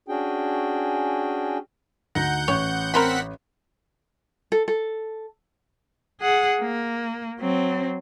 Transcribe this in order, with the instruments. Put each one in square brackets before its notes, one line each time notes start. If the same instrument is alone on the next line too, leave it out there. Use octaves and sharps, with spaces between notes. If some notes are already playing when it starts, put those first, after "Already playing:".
[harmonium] C#4 D4 F#4 G#4 G5
[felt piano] D2 D#4 A#6 [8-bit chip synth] F#5 G6
[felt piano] A1 [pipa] C#5
[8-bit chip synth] C4 F#5 B6 [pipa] A#4 C5 B5
[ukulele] A4
A4
[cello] G#4 F#5
A#3
F#3 C4